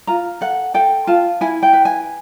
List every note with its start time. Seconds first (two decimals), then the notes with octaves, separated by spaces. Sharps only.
0.07 F4 A#5
0.41 A4 F#5
0.74 A4 G5
1.07 F4 A5
1.41 E4 G#5
1.63 G5
1.73 B4
1.85 G#5